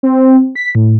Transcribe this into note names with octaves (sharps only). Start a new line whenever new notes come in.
C4
B6
A2